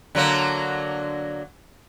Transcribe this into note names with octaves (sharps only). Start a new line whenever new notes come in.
D3 F#3 A#3